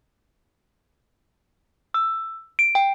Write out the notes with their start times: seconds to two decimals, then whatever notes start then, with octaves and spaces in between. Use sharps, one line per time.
1.94 E6
2.59 D7
2.75 G5